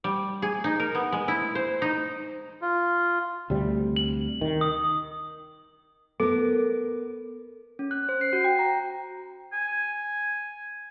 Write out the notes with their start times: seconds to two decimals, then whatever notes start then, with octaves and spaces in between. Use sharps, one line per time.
0.04 G3
0.42 G#4
0.64 D#4
0.80 A#4
0.95 B3
1.12 G#3
1.28 E4
1.55 C5
1.82 D#4
2.62 F4
3.50 D2 C3 G3
3.96 F#7
4.41 D#3
4.61 D#6
6.20 B3 A4 A#4
7.79 C#4
7.91 F#6
8.09 C5
8.21 C7
8.33 F#4
8.44 G5
8.59 A#5
9.53 G#5